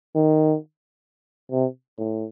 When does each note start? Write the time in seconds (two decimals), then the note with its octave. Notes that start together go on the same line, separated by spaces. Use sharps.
0.15 D#3
1.52 C3
1.98 A2